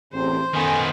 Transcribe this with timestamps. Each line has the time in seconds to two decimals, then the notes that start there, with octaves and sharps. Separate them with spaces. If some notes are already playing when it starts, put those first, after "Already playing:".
0.13 A1 E2 C3 C5
0.54 D#3 B3 C#4 A4 G#5